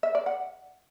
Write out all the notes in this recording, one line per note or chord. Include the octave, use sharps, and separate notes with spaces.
E5
D5
F#5